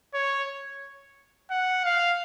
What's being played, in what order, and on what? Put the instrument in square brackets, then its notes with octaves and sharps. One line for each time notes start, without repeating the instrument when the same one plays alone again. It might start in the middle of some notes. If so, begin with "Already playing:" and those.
[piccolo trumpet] C#5
F#5
F5